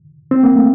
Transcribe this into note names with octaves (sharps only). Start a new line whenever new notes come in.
C4
A#3
A3